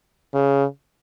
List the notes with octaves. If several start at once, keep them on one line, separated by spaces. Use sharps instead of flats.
C#3